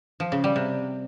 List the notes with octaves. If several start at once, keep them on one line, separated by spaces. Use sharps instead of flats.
F3
C#3
G3
C3